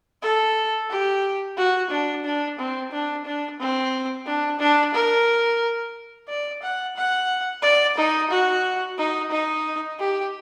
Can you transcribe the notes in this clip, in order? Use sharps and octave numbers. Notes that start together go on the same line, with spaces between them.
A4
G4
F#4
D4
D4
C4
D4
D4
C4
D4
D4
A#4
D5
F#5
F#5
D5
D#4
F#4
D#4
D#4
G4